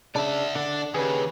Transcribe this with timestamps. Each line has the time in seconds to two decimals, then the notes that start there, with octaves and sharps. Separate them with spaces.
0.15 C#3 D4 D5 E5
0.55 D3 D4 D5
0.94 D#2 C#3 G4 G#4 B4